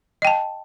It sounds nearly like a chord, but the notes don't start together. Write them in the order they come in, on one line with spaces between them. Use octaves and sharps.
D#5 G5 A5